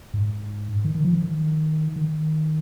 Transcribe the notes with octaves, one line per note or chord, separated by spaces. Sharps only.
G#2
D#3
D#3
F3
D#3
D#3